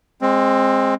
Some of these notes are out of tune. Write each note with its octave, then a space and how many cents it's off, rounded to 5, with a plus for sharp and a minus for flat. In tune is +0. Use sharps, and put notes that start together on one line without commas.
G#3 -5 C4 +20